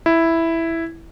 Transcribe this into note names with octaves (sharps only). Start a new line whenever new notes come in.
E4